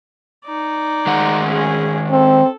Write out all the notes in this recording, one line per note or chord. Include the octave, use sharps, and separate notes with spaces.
D#4 D5
D#3 G#3 F#5
C#4 G#4
C4 A4